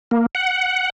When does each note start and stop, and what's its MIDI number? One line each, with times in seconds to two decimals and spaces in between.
0.11 0.26 58
0.35 0.90 78